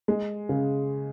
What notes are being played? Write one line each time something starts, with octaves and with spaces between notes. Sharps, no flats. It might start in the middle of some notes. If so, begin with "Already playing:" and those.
G#3
C#3